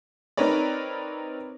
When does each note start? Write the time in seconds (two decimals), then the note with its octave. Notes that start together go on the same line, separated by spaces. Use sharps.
0.37 C4 D#4 A#4 B4 C#5 D5